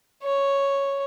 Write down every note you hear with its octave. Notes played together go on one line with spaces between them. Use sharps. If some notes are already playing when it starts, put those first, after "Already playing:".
C#5